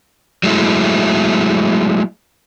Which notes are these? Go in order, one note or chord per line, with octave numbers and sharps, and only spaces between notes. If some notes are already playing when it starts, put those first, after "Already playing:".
F#3 G#3 A3 E4